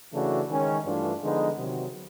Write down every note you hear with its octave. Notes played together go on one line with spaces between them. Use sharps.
C#3 E3 A3 D4 F#4
D#3 G#3 C#4
G2 E3 A3 D4 F4
D3 F3 G#3 B3 D#4
C3 D#3 F#3